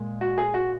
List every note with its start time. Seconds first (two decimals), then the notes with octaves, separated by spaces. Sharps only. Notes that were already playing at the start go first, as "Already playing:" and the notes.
Already playing: A#2 G#3
0.21 F#4
0.38 G#4
0.54 F#4